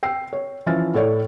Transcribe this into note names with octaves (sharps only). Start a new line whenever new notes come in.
G5 E6 C7
C#5
E3 F3 C#4 E5 F6 A6
A2 A4 C#5 D5